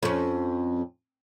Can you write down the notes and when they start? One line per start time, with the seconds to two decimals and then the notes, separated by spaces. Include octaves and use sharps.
0.03 F2 C#4